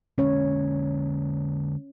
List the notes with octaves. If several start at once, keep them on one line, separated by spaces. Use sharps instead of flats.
D3 G#3 A#3 C#4 C#5